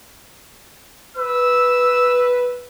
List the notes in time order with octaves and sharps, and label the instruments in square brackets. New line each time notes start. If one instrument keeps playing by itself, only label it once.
[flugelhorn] B4 [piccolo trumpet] E6